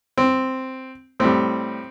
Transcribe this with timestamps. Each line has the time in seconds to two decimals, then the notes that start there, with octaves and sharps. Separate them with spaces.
0.17 C4
1.20 A2 G3 C4